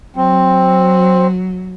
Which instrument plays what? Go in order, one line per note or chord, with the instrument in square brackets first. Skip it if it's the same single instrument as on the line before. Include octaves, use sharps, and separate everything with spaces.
[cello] F#3 [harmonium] C4